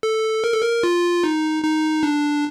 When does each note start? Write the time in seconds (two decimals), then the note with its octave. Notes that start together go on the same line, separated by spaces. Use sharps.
0.03 A4
0.44 A#4
0.52 A4
0.62 A#4
0.83 F4
1.24 D#4
1.64 D#4
2.03 D4